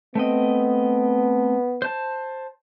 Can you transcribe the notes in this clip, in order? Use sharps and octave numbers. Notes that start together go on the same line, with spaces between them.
A3 B3 C4 D#5
C5 A5